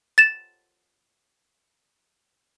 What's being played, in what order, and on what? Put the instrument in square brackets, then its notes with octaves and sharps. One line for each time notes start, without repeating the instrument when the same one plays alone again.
[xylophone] A6 E7